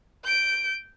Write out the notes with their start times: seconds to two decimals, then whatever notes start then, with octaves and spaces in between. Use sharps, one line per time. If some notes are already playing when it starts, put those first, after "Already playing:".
0.24 G6 D7